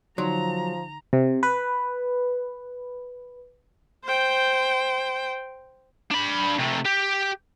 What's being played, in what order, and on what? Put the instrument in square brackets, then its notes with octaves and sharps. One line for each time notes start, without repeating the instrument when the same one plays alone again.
[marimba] D3 D#4 C6 [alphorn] F3 [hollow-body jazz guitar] F#3 [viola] A#5
[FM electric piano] C3
B4
[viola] C5 G5
[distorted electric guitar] D4 B5
C3 A3
G4